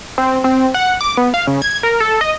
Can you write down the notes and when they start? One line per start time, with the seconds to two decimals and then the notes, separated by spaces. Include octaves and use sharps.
0.18 C4
0.44 C4
0.74 F#5
1.01 D6
1.17 B3
1.34 F5
1.47 C#3
1.62 G#6
1.83 A#4
2.00 A4
2.21 D#5